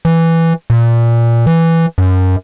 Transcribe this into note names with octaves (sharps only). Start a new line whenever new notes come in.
E3
A#2
E3
F#2